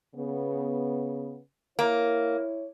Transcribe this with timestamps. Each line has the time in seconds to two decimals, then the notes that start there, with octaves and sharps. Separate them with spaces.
0.15 C#3 B3
1.79 A#3 E4 C#5